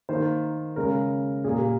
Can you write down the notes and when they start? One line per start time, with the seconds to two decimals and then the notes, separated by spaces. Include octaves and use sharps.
0.09 D#3 A#3 C5
0.76 C#3 G#3 A#4
1.44 A#2 G3 A#3 G#4